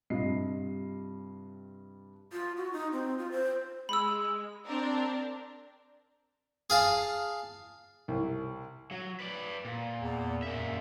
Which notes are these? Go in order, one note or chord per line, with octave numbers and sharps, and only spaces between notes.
G2 C3 F4 D#5 C7
F4
F#4
D#4
C4
F4
C5
G#3 B5 E6
C4 D4 A#4
G#4 F5 A5
C2
F#3
B4 D5
A#2
E2
F#2 A#2 E5